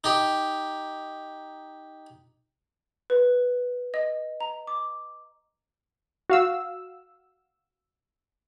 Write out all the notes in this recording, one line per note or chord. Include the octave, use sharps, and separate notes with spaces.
D#4 G4
B4
D#5
A#5
D6
F#4 F5 E6